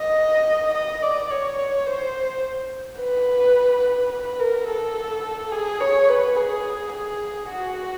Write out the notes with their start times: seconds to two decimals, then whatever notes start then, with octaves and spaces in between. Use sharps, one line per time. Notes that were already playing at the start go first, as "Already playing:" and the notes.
Already playing: D#5
0.74 D#5
1.02 D5
1.30 C#5
1.86 C5
2.99 B4
4.12 B4
4.40 A#4
4.68 A4
5.52 G#4
5.80 C#5
6.09 B4
6.36 G#4
6.92 G#4
7.49 F#4